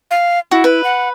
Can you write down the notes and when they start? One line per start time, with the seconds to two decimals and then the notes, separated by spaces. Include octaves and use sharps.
0.11 F5
0.51 E4 F#4
0.64 B4
0.84 F#5